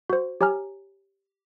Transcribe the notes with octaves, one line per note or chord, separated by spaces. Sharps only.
F#4 C5
G4 C#5 G#5 A#5 F6